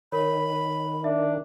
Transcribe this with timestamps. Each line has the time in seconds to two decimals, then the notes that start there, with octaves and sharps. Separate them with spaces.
0.12 D#3 A#4 C#5 B5
1.04 D4 E5